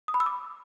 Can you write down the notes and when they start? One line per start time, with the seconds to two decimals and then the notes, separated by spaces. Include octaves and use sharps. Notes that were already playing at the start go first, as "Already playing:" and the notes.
0.08 D#6
0.14 B5
0.20 E6
0.26 D6